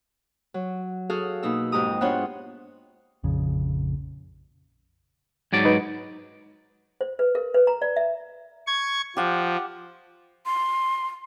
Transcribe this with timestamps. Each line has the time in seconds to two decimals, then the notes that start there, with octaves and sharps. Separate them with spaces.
0.54 F#3
1.10 F#4 G#4 A4 F5
1.43 B2 A#3 D#4 E6
1.72 F2 G#2 G#3 G4 A#5 D#6
2.01 B3 D4 F4 C5 C#5 F#5
3.24 A#1 F2 C#3
5.53 G#2 F#3 D5
5.65 D#4 B4
7.01 C5
7.19 B4
7.35 A#4
7.54 B4
7.67 A#5
7.82 D5
7.96 E5
8.67 C#6 G#6
9.17 F3 G4 F#5
10.46 C6